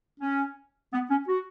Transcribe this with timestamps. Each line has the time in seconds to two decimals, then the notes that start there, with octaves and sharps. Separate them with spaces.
0.20 C#4
0.93 B3
1.10 C#4
1.28 F#4